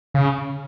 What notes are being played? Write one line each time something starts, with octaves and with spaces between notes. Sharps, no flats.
C#3